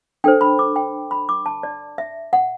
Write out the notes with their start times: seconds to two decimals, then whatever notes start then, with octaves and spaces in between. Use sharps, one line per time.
0.24 D4 A4 C5 G5
0.41 B5
0.59 D6
0.76 G5
1.11 B5
1.29 D6
1.46 A5
1.63 D5
1.98 E5
2.33 F#5